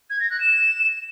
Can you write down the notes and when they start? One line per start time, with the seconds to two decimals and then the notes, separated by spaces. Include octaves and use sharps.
0.10 G#6
0.20 A#6
0.30 F#6
0.40 E7